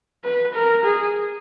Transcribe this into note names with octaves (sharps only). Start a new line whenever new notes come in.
B4
A#4
G#4